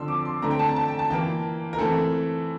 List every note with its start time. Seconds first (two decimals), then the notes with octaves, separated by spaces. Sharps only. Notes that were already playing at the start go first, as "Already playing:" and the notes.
Already playing: D3 F3 C4 C6 E6
0.08 D6
0.25 C6
0.42 D3 A3 C4 A#5
0.51 G5
0.59 A5
0.67 A#5
0.76 A5
0.88 G5
0.99 A5
1.10 E3 A#3 G5
1.73 A#4
1.79 E3 A3 C4 A4